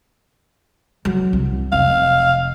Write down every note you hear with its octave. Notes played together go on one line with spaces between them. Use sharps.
F#3
C2
F1 F5